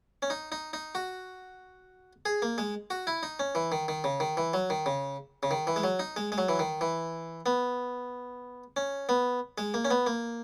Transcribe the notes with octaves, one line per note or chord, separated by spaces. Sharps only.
C#4
D#4
D#4
D#4
F#4
G#4
A#3
G#3
F#4
E4
D#4
C#4
E3
D#3
D#3
C#3
D#3
E3
F#3
D#3
C#3
C#3
D#3
E3
G#3
F#3
D#4
G#3
G#3
F#3
E3
D#3
E3
B3
C#4
B3
G#3
A#3
C#4
B3
A#3